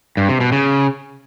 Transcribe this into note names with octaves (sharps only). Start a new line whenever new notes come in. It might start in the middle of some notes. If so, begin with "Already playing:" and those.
G2
C3
B2
C#3